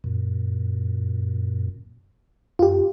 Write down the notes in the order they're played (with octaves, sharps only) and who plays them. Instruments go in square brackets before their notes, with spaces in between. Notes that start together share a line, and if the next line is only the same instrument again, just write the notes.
[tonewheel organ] F#2 A#2
[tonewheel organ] F#2 [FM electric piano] F4 G4